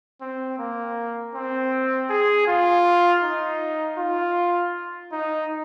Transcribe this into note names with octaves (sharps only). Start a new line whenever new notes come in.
C4
A#3
C4
G#4
F4
D#4
F4
D#4